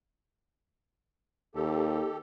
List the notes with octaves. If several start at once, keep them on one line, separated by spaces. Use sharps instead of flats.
D#2 G4 A4